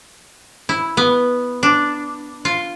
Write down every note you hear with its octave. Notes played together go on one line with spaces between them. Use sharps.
E4
B3
D4
F4